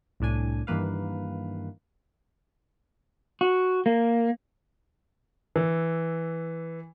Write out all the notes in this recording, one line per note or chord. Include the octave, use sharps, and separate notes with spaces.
C2 A2 D4 G#5
G2 D#3 E3 A#3 B4 F5
F#4
A#3
E3